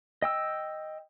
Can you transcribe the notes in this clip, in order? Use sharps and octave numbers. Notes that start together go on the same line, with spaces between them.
D#5 G5 E6